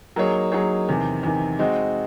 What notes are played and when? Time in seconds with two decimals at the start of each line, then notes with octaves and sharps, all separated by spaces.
0.16 F#3 A#3 D#4 G#4 C#5
0.52 F#3 A#3 D#4 G#4 C#5
0.89 E2 C3 D#3
1.23 E2 C3 D#3
1.59 G#3 C4 D#4 F#4